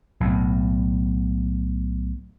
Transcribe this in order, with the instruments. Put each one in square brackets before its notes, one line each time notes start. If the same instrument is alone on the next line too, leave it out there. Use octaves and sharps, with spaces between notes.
[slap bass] B1 A2